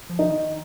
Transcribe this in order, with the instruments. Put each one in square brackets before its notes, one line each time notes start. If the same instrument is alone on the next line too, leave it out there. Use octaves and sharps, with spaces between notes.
[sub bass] F3
[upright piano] D#4
[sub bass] D#3